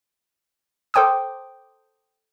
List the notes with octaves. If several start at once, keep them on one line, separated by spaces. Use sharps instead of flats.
A4 C5 G5 D6 D#6